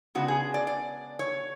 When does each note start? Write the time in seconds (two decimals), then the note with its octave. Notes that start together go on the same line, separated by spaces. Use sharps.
0.15 C#3 G#3 B3 D4 F#4
0.28 G#4
0.54 D5
0.67 D5
1.19 C#5